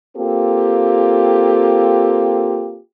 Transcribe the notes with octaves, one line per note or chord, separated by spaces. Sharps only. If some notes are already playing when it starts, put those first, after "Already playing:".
A#3 C4 F4 G4 A4